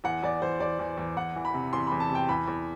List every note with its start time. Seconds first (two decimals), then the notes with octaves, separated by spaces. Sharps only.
0.04 E2 F#5
0.23 E2 D5
0.42 E2 C5
0.60 E2 D5
0.79 E2
0.98 E2
1.16 E2 F#5
1.36 E3
1.45 B5
1.54 C3
1.73 E2 C6
1.87 E2 B5
2.00 A5
2.09 C3
2.15 G5
2.28 E2 B5
2.48 E2